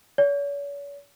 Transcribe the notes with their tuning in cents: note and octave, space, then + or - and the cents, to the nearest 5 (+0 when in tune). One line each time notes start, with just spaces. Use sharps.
C#5 +40